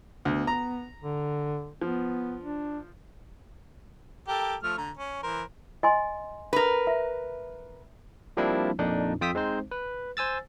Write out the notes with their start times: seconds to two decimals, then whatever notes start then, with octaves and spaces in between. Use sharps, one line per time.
0.25 D2 B3
0.47 A#5
1.02 D3
1.82 F3 B3
2.42 D4
4.28 G4 A4 A#4
4.63 F3 A3 F6
4.78 D3 A#5
4.98 C#4
5.23 E3 A#4 C5
5.83 D#5 G#5 C6
6.53 A#4 B4
6.87 E5
8.37 F3 G3 A#3 C4 D4 E4
8.79 F2 A#2 D4 D#4
9.21 F2 F4 G5 D#6 E6 B6
9.35 G#3 C4 D#4 C5
9.71 B4
10.17 C5 G#5 E6 A6